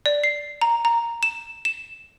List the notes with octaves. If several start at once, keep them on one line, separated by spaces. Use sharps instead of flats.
D5
C7
A#5
A#5
E7
E7